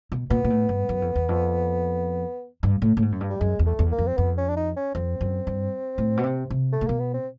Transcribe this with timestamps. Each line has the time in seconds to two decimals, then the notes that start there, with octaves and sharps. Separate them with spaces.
0.12 B2
0.30 A#2 B3
0.44 A#2
0.50 A2
0.69 G2
0.89 F#2
1.02 F2
1.16 E2
1.29 F2
2.63 G2
2.82 A2
2.97 A2
3.02 G#2
3.12 F#2
3.21 G2
3.30 G3
3.40 F#2 G#3
3.59 E2
3.66 A3
3.79 E2
3.91 A#3
3.98 F2
4.07 C4
4.17 F2 B3
4.38 C#4
4.49 D4
4.57 D#4
4.76 C#4
4.95 F2 C4
5.21 F#2
5.47 G2
5.98 A2
6.17 B2
6.24 C3
6.50 C3
6.72 A3
6.81 A#2
6.87 B2 A#3
7.00 B3
7.14 C4